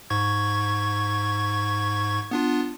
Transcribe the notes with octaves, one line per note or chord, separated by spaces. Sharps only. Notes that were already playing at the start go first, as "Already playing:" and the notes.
G#2 C#6 G#6
B3 D4 F4